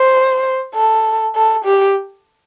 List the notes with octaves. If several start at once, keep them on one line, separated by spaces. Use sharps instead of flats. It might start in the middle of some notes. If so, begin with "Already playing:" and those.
Already playing: C5
A4
A4
G4